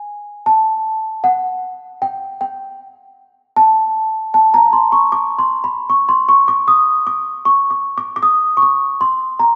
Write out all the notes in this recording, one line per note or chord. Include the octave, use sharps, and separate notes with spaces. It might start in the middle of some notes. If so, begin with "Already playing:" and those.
Already playing: G#5
A5
F#5
G5
G5
A5
A5
A#5
C6
C#6
D6
C6
B5
C#6
C6
C#6
D6
D#6
D6
C#6
D6
D6
D6
D#6
C#6
D6
C6
A#5